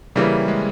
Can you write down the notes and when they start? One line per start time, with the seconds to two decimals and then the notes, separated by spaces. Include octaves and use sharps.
0.16 C#3 E3 G3 A#3 C#4 E4
0.48 G#3